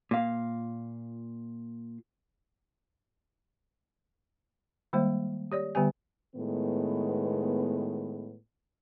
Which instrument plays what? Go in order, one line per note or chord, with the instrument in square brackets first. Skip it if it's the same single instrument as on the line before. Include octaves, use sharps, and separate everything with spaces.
[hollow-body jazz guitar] A#2 F5
[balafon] D#3 G3 G#3 A#3 C5
G4 C#5 D5
D3 G3 B3 G4 G#5
[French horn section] A2 D#3 G#3 B3